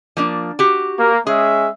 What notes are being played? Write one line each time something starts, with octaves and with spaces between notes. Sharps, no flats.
F3 A#3 D4
F#4 G4
A#3
G#3 C#4 G#4 E5